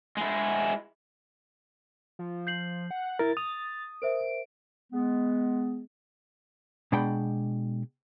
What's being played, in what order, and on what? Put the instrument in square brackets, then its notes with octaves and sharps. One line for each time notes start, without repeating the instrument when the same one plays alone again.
[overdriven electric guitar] G#3 E4
[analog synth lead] F3
[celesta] G6 C7 F#7
[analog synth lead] F#5
[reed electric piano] E4 A#4 [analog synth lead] A6
[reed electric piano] D#6 [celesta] F7
[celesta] A#4 C5 E5 [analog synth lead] D7
[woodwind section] G#3 B3
[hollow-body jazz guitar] B2 G#3 D4 F#5 G5 B5